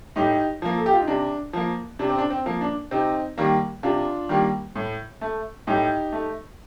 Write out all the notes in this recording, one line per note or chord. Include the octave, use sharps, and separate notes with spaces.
A2 D#4 G4
F3 A#3
A4
G4
F4
D#4
C3 D4
F3 A#3
C3 D4
C4
D4
C4
F3 A#3
D4
C3 C4 D#4
D#3 G3 A#3
C3 D4 F4
D#3 G3 A#3
A2
A3
A2 D#4 G4
A3